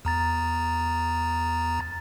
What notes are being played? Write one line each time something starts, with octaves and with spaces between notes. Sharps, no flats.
E2 A#5 A6